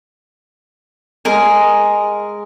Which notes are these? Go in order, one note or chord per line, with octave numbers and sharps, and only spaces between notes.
G#3 G#4 A#4 D#5